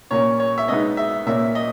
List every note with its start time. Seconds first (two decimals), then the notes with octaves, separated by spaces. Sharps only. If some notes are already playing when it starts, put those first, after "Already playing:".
0.11 A#2 A#3 C#4 C#5
0.40 C#5
0.58 E5
0.68 B2 G#3 B3 D#4 D#5
0.97 E5
1.26 A#2 A#3 C#4 E5
1.55 D#5